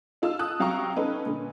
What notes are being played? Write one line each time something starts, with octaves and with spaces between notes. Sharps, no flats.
D#4 F4 E6
A5 D#6 F#6
C3 F#3 F5 G5 A#5 C#6
C#4 D#4 A4 B4
A#2 D3